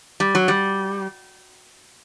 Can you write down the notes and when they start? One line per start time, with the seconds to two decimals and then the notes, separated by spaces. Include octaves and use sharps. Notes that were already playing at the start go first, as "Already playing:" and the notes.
0.20 G3
0.35 F#3
0.48 G3